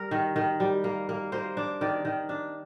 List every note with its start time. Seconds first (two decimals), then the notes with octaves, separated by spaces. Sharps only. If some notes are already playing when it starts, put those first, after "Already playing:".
Already playing: G3 A#4
0.11 D#3
0.36 D#3
0.60 G3
0.84 A#3
1.09 A#3
1.32 A#3 C5
1.57 D4
1.81 D#3 D5
2.05 D#3
2.29 D4